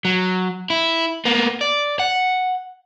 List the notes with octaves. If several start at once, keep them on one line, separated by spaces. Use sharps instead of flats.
F#3
E4
A#3 B3
D5
F#5